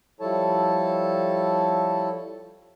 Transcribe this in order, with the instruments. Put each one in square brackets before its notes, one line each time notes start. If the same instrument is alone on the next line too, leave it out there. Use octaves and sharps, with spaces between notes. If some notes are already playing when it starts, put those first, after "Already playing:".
[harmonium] F3 G3 E4 A4 C#5 A5